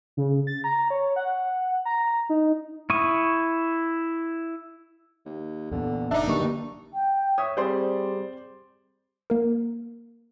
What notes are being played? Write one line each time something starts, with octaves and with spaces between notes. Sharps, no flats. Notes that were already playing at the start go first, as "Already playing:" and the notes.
C#3
A6
A#5
C#5
F#5
A#5
D#4
E4 C#6 D#6
D#2
E2 A#2 D3 B3
F#1 D4 D#4 E5
A1 G2 D3 F#3 A#3 C#6
G5
C#5 E5 C#6 D#6
G3 C4 G4 G#4 C5 D5 C6
A#3 A#4